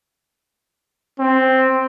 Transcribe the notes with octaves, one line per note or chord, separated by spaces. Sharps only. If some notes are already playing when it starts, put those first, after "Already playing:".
C4